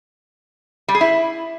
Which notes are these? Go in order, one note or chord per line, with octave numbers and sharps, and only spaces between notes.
G3
G#4
E4